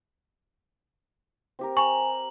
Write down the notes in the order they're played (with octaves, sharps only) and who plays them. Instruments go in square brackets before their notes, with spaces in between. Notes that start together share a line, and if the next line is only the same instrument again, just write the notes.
[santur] C4 G4 A#4
[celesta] G#5 [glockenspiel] A#5 F#7 [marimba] C#6